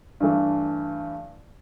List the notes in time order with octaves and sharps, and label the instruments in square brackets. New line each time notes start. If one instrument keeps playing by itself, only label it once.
[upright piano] G2 E3 A3